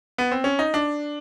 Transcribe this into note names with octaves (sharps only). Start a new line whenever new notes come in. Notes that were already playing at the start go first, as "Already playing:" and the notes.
B3
C4
C#4
D#4
D4